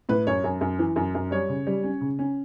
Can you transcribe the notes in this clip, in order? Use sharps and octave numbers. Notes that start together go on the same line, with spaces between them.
A2 B4
F#2 C#5
F#2
F#2
E3
F#2
F#2
G3 C#5
C#3
G3
C#4
C#3
C#4